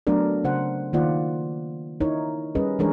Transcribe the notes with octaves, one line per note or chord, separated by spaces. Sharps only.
F#3 A3 B3 D4 A#4 D5
C#3 C5 F#5
D#3 A#3 F4 C5 D5 F#5
D#4 E4 A#4 C#5
G3 C#4 G#4 A#4 B4 D#5
E3 G#3 D4 G#4 A#4 C#5